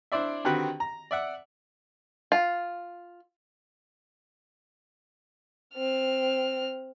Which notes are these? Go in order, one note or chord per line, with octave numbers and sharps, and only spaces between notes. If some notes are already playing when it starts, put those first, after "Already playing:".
D4 E4 C5 D5 E5
D3 D#3 C4 F#4 G4 B4
A#5
D5 E5 F#5
F4
C4 F6